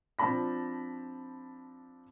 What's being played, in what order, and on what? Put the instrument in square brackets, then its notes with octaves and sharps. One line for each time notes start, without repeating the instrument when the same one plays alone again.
[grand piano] F3 C4 D4 A5 B5 A#6